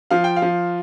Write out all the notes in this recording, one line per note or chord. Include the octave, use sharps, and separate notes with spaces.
F3 F5
G5
F5
F3